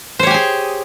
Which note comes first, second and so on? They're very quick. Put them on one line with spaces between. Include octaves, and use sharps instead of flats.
C5 C#5 G4 G#5 G#4